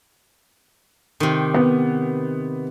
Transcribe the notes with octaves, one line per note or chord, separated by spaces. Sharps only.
C3 D#3
B3